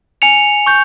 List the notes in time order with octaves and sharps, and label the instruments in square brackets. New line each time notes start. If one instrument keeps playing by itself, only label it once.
[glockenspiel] G#5 C#7 F7
C#6 G6